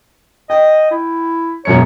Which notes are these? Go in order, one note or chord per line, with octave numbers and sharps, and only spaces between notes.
D#5 G5
E4
E1 F#2 C#5 C#7